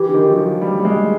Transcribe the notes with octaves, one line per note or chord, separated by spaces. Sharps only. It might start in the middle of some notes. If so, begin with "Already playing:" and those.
Already playing: E3 G4
D3
D#3
F#3
F3
G3
G3
G#3